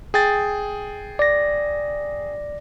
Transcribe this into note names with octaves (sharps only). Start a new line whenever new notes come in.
G#4 G5 A6
D5 A#6